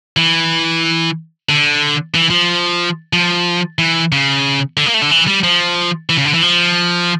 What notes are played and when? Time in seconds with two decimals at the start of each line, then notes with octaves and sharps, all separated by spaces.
0.17 E3
1.49 D3
2.15 E3
2.30 F3
3.13 F3
3.78 E3
4.12 C#3
4.77 D3
4.86 A#3
4.94 A3
5.02 D3
5.11 E3
5.27 G3
5.43 F3
6.10 E3
6.18 C#3
6.25 D3
6.34 E3
6.42 F3